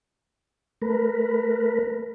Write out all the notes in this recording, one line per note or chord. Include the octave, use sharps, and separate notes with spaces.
A3 A#4 B4